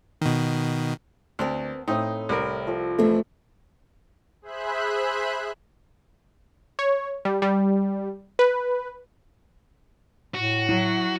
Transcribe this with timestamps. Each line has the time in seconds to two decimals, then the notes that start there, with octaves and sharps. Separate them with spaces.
0.22 B2 D#3
1.39 D2 B3 C4 A#4
1.88 A2 C4 D#4 E5 D#6
2.29 C2 A#4
2.67 F3 A4 D6
2.98 F2 E3 A3
4.42 G#4 C5 E5 B5 F#6
6.79 C#5
7.25 G3
7.42 G3
8.39 B4
10.35 A2 F#4
10.69 F#3 E4